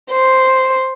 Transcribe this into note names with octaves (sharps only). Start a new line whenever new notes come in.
C5